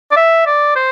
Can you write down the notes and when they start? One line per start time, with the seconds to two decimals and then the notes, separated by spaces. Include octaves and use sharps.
0.11 D5
0.17 E5
0.47 D5
0.76 C5